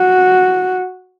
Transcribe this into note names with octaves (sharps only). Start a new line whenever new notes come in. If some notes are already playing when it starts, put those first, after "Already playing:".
Already playing: F#4